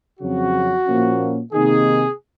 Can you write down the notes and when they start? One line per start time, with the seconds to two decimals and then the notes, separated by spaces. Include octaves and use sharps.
0.20 F2 C#3 F#3 C4 F#4
0.86 A#2 F3 A#3 C#4
1.53 C3 D#3 A#3 D#4 G#4